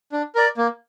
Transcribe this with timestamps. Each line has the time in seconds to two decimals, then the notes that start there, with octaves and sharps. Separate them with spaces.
0.12 D4
0.35 A#4 D5
0.57 A#3